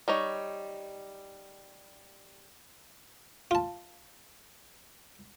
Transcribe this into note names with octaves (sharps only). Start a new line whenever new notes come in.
G3 D#4 C#5
F4 A5